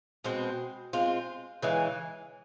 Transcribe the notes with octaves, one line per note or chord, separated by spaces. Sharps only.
B2 G#3 C4
G#3 C4 F4
C#3 E3 G#3